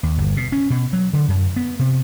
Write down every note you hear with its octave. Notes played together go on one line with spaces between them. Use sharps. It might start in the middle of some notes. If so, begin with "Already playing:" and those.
D#2
G1
B2
C#4
B2
F#3
D3
F#2
B3
C3